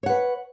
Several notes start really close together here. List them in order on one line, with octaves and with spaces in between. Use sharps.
C#5 F#5 B4